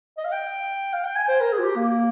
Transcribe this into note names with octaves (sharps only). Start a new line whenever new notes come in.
D#5
F5
G5
F5
G5
G#5
C5
A#4
G#4
F4
G4
A#3